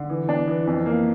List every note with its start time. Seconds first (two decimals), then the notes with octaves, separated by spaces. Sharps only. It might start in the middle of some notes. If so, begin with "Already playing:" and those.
Already playing: D3
0.10 E3
0.29 D4
0.47 E3
0.67 F2
0.86 A#3